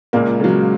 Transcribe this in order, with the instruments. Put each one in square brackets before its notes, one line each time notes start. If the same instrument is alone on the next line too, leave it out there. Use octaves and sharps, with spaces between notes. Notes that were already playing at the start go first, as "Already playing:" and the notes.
[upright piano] C#2 [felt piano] A#2 A#3
[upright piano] C#3 F#3